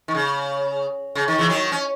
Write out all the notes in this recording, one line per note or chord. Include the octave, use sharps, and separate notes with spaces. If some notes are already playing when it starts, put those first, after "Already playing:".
D#3
C#3
C#3
D#3
C#3 E3
D#3 F#3
C#4